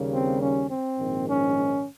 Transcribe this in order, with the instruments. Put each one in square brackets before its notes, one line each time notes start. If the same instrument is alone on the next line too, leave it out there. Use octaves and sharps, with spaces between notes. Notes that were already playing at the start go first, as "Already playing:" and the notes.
Already playing: [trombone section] D#2 C#3 G3 A#3
C4
C#4
C4
A#1 G#2 D#3
C#4